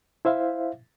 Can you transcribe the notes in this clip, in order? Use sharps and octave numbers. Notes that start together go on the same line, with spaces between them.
E4 C5 E5 F5